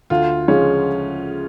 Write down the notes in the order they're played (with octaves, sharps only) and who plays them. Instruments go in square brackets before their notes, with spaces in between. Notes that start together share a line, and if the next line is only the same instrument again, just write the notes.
[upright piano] D2 F4
C#3 F3 G#3 C#4